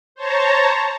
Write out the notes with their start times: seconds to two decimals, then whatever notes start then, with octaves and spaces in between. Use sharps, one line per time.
0.15 C5 C#5 A5 A#5